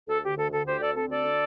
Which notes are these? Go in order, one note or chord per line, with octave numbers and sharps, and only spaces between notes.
D2 A4
D3 G4
D2 A4
D3 A4
D2 G4 C5
D3 A4 D5
C4 A4
D2 A4 D5
D3